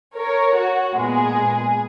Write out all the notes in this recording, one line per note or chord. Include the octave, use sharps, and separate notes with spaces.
A#4 C#5
F#4
A#2 G#3 B3 G#4